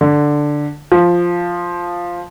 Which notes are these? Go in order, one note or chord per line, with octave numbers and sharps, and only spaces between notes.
D3
F3